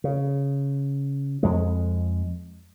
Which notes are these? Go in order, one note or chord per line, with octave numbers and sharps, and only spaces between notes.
C#3
F2 G#3